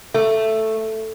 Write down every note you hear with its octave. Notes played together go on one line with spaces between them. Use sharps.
A3